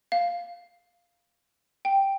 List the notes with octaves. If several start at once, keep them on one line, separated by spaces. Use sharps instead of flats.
F5
G5